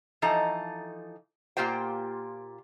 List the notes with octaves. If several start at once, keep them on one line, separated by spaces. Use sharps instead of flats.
E3 F3 D#4 A4 A#5
A#2 A#3 F4 G4 C5 G5